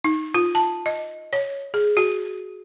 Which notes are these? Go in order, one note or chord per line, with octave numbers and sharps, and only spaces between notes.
D#4
F4
A5
D#5
C#5
G#4
F#4